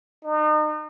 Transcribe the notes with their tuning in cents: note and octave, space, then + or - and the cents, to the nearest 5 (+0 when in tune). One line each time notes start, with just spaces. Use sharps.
D#4 -35